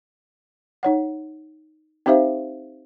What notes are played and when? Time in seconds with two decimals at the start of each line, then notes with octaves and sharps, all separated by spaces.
0.83 D#4 C#5 F#5
2.06 C4 D#4 G4 C5 E5 F5